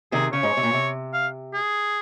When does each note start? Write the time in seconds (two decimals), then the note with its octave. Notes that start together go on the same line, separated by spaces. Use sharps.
0.12 C3 D#3 G#4
0.32 C#3 C#5
0.43 G#2
0.57 C3
0.63 A#2
0.73 C3
1.13 F5
1.53 G#4